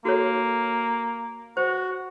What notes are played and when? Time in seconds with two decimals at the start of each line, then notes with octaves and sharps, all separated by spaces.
0.05 A#3 F#4 A4 C#5
1.57 F#4 C5